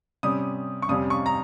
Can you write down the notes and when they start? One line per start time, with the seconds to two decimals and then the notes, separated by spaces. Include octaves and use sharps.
0.23 C3 G3 C#4 D#6
0.82 C#6
0.89 F2 C3 G3 C#4 D#6
1.10 C#6
1.26 A#5